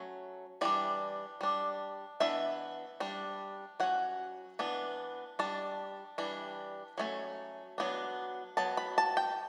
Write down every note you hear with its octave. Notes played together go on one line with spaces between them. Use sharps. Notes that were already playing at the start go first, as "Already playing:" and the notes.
Already playing: F#3 A3 C#4
E3 G3 D4 D5
G3 D4
E3 B3 D4 E5
G3 D4
F#3 C#4 F#5
E3 B3 D4
G3 D4 A5
E3 G3 D4
F#3 A3 C#4
F#3 B3 D4
F#3 B3 A5
B5
A5
G5